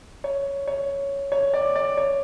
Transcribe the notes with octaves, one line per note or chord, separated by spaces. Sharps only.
C#5
C#5
C#5
D5
D5
C#5